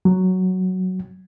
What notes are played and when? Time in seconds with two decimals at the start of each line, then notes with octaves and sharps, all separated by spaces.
0.05 F#3